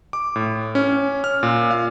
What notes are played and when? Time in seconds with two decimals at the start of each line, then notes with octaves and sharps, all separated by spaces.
0.13 D6
0.36 A2
0.75 C#4
1.24 F6
1.43 A#2
1.71 F5